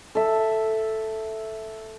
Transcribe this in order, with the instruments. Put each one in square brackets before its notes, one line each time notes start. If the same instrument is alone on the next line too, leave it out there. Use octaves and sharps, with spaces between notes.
[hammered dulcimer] A4 E5